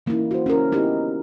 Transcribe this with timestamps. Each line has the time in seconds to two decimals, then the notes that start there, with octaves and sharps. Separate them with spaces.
0.06 E3 A#3 C#4 D#4 E4
0.31 F#4 C5
0.46 C#4 E4 A#4
0.72 B3 D#4 E4 G4